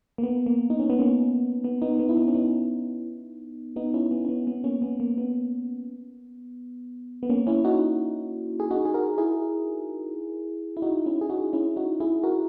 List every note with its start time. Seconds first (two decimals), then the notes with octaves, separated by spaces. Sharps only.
0.18 A#3
0.23 B3
0.46 A#3
0.70 D#4
0.80 C#4
0.90 B3
0.99 A#3 C#4
1.64 B3
1.82 B3 D#4
1.99 B3
2.09 E4
2.17 B3 D#4
2.27 C#4
2.35 B3 D#4
3.76 B3 D#4
3.94 C#4 E4
4.11 B3
4.25 C#4
4.29 B3
4.47 B3
4.64 A#3 C#4
4.82 B3
5.00 A#3
5.18 B3
7.23 B3
7.29 A#3 C#4
7.47 C#4 E4
7.65 D#4 F#4
8.60 G#4
8.71 D#4 F#4
8.85 G#4
8.94 F#4 A#4
9.18 E4 G#4
10.77 E4
10.82 D#4 F#4
11.06 C#4 E4
11.21 G#4
11.30 D#4 F#4
11.53 C#4 E4
11.76 D#4 F#4
12.00 E4 G#4
12.23 F#4 A#4